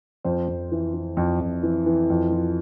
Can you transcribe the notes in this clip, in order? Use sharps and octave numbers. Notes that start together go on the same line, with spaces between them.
F2 C5
F2
E3
E3
F2
F2
E3
E3
F2
F3